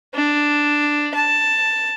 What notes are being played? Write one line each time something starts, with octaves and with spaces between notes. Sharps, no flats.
D4
A5